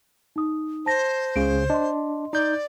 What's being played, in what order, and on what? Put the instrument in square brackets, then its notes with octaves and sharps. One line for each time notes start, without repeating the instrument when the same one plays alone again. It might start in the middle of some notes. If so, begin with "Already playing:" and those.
[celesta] D#4 D#6
[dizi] C5 [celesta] A5 A#6
[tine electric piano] C#2 C#3 [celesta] D7
[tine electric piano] D4 [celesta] D#5 C6
[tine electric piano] D#4 G6 [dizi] D5